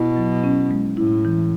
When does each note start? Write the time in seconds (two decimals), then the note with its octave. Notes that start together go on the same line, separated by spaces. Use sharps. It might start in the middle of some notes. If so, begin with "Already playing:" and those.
Already playing: B2 E4
0.17 F#3
0.44 C#4
0.71 G#3
0.97 A2 E4
1.25 E3